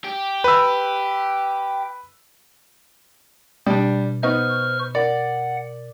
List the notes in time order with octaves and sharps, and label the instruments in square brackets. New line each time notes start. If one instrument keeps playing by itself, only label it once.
[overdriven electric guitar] G4
[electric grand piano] B4 E6
[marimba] B2 [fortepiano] G3 D4
[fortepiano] B3 D#4 [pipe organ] C5 C#6 F6
[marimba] A#4 [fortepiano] D5 [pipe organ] F#5